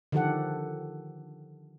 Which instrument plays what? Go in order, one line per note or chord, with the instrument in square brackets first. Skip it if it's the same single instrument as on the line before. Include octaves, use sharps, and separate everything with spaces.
[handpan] D3 D#3 F3 G4 A4 F#5